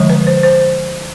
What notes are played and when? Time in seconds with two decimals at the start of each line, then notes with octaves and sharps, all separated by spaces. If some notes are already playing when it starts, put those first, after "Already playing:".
Already playing: D3 F3 G#3
0.10 B4
0.27 C5
0.43 C5